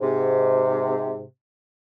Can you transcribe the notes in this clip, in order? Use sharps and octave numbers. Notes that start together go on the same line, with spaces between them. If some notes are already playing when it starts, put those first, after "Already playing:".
G#2 C3